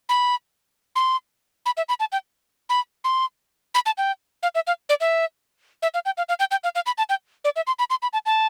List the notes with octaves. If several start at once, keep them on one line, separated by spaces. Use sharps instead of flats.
B5
C6
B5
E5
B5
A5
G5
B5
C6
B5
A5
G5
F5
E5
F5
D5
E5
E5
F5
G5
F5
F5
G5
G5
F5
F5
B5
A5
G5
D5
E5
C6
B5
C6
B5
A5
A5